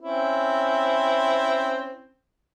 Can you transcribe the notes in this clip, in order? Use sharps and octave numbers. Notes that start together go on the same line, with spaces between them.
C4 C#4 E4